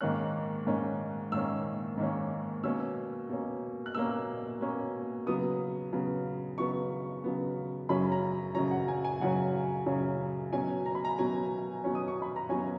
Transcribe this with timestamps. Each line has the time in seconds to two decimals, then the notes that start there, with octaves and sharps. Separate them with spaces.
0.01 G#2 D#3 A#3 C#4 F#6
0.66 G#2 D#3 A#3 C#4
1.32 G#2 D#3 A#3 C#4 E6
1.98 G#2 D#3 A#3 C#4
2.64 B2 A#3 C#4 E6
3.29 B2 A#3 C#4
3.86 F#6
3.95 B2 A#3 C#4 E6
4.61 B2 A#3 C#4
5.27 C#3 F#3 B3 D#6
5.93 C#3 F#3 B3
6.58 C#3 F#3 B3 C#6
7.24 C#3 F#3 B3
7.89 F#2 C#3 F#3 C#4 B5
8.12 A#5
8.55 F#2 C#3 F#3 C#4 A#5
8.71 F#5
8.88 G#5
9.05 G#5
9.20 F#2 C#3 F#3 C#4 F#5
9.86 F#2 C#3 F#3 C#4
10.52 B2 F#3 C#4 G#5
10.86 A#5
10.95 B5
11.05 A#5
11.18 B2 F#3 C#4 G#5
11.84 B2 F#3 C#4
11.95 D#6
12.08 C#6
12.22 B5
12.36 A#5
12.49 B2 F#3 C#4 G#5